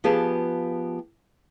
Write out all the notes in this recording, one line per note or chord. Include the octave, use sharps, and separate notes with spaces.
F3 B3 G4 G#4 B4 A5